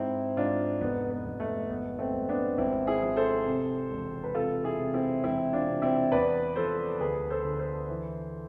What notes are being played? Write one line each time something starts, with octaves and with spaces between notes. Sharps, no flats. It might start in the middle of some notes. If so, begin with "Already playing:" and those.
Already playing: G#2 C4 E4
G#2 D4 F4
F1 B3
B3
F1
A3
G#1 B3
A3 C4
G#1
B3 D4
G#1 C4 E4
E4 G#4
F3
A4 C5
C3
E1
B4
C3 F4 A4
E4 G#4
C3
C4 E4
E1 C4 E4
D4 F4
C3
C4 E4
E2 B4 D5
F3 A4 C5
D2 G#4 B4
A4 C5
D3
A4 C5
E3